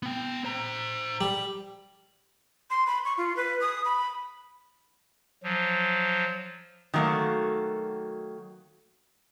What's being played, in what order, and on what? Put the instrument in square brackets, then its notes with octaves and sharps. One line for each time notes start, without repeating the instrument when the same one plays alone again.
[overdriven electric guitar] B3 G5
C5 A#5
[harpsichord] G3
[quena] C6
B5
C#6
F4
B4
D#6
B5
[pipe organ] F3 F#3
[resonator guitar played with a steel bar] D#3 F#3 A3 A#3 F#4